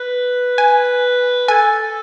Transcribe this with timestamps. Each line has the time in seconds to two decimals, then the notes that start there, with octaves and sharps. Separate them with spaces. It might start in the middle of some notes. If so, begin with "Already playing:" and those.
Already playing: B4
0.58 G#5
1.48 A4 G#5